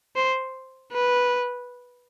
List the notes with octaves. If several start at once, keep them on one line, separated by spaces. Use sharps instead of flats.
C5
B4